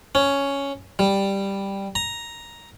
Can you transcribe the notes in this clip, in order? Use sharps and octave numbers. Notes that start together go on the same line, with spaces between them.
C#4
G3
A#5